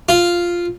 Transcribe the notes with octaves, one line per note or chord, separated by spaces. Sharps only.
F4